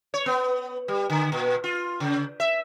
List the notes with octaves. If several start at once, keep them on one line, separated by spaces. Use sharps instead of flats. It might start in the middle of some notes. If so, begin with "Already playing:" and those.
C#5
B3
G3
D3
A#2
F4
C#3
E5